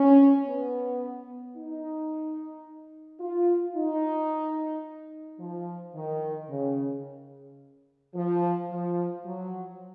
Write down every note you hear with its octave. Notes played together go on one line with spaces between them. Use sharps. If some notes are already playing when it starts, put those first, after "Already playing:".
Already playing: C#4
B3
D#4
F4
D#4
F3
D#3
C#3
F3
F3
F#3